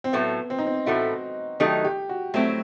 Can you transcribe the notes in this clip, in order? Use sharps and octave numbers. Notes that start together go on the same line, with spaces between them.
C4
A2 F#3 A3 B3
C4
D#4
C4
A2 E3 A3 E4 F#4
D#3 F#3 A3 D#4 G4
G4
F#4
F#3 A3 C4 E4